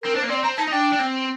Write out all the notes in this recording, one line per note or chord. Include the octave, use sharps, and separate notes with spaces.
C4 A#4
D4 C5
A#3
C4 D5
C4 A#5
D#4 A5
D#4
D4 G5
D4
C4